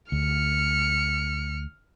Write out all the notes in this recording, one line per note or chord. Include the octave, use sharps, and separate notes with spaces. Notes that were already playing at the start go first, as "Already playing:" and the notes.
D2 F6 C#7